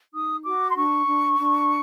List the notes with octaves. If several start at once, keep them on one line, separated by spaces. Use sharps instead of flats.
D#4 D#6
F#4 D6
C6
D4 C#6
D4
D4